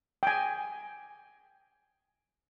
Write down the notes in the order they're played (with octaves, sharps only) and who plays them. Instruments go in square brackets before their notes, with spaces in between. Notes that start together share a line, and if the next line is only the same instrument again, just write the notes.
[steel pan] G5 G#5